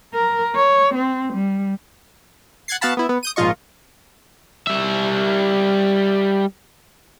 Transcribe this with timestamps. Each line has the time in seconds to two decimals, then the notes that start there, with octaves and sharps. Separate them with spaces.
0.14 A#4
0.55 C#5
0.95 C4
1.33 G3
2.68 F#5 F#6 G#6 A6 C7
2.81 B3 F#4 F5 F#5 A5 B5
2.97 B3 E4
3.09 B3
3.23 D#6 G6 D#7
3.36 G#1 A#2 F3 F4 D#5 C#6
4.67 G3 E5